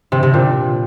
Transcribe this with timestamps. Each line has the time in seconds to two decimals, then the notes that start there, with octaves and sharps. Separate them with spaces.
0.12 C3
0.23 C3
0.34 A#2